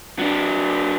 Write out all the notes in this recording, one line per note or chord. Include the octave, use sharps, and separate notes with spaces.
F#3 D4